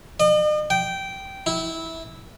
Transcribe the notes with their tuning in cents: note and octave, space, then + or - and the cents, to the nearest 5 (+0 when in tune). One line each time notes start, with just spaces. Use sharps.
D#5 -45
G5 -15
E4 -15